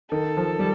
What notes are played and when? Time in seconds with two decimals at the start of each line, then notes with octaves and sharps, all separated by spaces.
0.12 D#3 A4
0.37 F3
0.59 G3